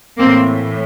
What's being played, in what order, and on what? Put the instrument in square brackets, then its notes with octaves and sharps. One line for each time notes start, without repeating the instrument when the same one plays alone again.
[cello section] A2 E3 A#3 C4